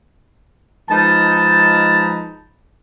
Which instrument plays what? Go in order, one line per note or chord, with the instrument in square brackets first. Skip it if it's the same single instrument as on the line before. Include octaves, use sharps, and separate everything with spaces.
[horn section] F3 G#3 D#4 B4 A5